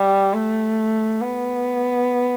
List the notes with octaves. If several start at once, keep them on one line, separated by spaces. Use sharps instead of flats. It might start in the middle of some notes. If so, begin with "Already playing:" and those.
Already playing: G3
A3
B3